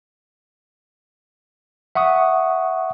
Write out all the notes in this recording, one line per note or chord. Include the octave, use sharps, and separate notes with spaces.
E5 F#5 C#6 D#6